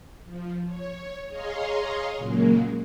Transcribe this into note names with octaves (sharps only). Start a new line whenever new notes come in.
F3
C#5
G#4 C#5 D#5 F5 A#5 C6
A#2 C#3 F#3 G#3 A#3